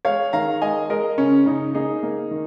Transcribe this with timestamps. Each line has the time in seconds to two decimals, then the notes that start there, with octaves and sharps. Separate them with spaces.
0.05 G#3 C#5 F5
0.33 D#3 F5 A#5
0.61 G#3 D#5 G#5
0.90 G#3 A#4 D#5
1.18 C#3 C#4
1.46 C#3 D#4
1.75 A#3 D#4 G#4
2.03 A#3
2.31 D#3